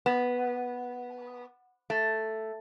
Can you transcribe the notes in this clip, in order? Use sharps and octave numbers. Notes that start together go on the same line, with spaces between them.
B3
A3